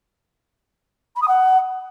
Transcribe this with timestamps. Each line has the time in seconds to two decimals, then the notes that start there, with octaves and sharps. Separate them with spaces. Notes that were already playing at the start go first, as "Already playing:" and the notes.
1.15 B5
1.21 D#6
1.27 F#5